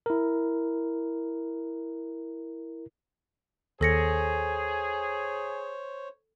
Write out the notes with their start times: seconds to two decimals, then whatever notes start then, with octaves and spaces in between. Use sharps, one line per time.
0.06 E4 A#4
3.81 D#2 G#4 A4 C5 C#5 A#6 C#7